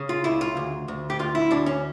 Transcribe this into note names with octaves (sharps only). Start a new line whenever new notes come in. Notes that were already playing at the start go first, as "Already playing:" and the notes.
Already playing: C#3
F4
C#2 E4
F4
D2
D2
G4
D2 F4
E4
D2 D4
C#4